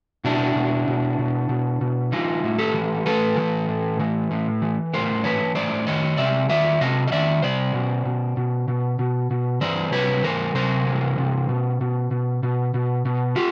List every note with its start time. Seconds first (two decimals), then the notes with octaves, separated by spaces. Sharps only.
0.24 B2 D4 E4
0.56 B2
0.88 B2
1.19 B2
1.49 B2
1.81 B2
2.12 E3 D#4 F4
2.44 A2
2.58 G4 A4
2.74 E3
3.06 A2 A4 B4
3.37 E3
3.68 A2
3.99 E3
4.31 A2
4.62 E3
4.93 A2 A#4 C5
5.24 E3 B4 C#5
5.55 A2 C5 D5
5.87 D#3 C#5 D#5
6.17 C3 D5 E5
6.49 D#3 D5 E5
6.81 C3 D#5 F5
7.07 D#5
7.12 D#3 D5 E5
7.42 C3 C5 D5
7.74 B2
8.05 B2
8.37 B2
8.68 B2
8.99 B2
9.31 B2
9.61 E3 C5 D5
9.92 C3 B4 C#5
10.24 E3 A#4 C5
10.55 C3 A#4 C5
10.87 E3
11.18 C3
11.49 B2
11.81 B2
12.11 B2
12.43 B2
12.74 B2
13.05 B2
13.36 F4 G4